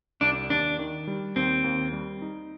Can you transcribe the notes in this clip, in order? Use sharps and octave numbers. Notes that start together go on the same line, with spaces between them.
C2 D4
D#2 D4
D#3
G3
D#2 C4
D#2
G3
D#4